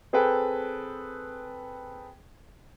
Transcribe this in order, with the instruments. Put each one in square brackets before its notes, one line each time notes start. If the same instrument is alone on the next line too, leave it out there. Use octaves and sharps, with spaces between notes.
[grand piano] C4 G#4 A4 B4 G5